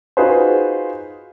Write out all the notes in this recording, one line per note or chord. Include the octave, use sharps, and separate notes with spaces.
D#4 F4 F#4 G#4 B4 C5